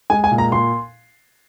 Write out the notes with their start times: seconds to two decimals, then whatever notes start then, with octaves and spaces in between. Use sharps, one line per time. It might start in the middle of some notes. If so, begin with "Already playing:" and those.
0.10 G#3 G#5
0.24 G#5
0.31 A#2
0.38 A#5
0.52 A#2 C6